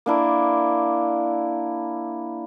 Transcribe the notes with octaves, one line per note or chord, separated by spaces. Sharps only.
A#3 D4 E4